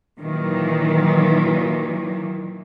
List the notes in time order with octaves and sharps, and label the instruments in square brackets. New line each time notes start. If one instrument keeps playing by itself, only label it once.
[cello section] A#2 D#3 E3 F#3